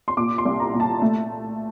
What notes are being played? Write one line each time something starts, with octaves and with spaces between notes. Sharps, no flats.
C6
A#2 D6
C6
C2
A#5
A#2
A5
A3